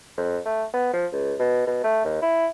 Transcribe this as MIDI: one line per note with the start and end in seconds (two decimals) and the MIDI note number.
0.17 0.39 41
0.46 0.64 57
0.74 0.90 59
0.93 1.06 53
1.12 1.34 37
1.40 1.67 47
1.67 1.83 47
1.84 2.03 57
2.05 2.22 39
2.22 2.47 64